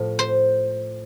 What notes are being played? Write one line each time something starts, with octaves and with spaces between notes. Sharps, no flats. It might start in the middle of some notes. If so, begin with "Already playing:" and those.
Already playing: A2 F3
C5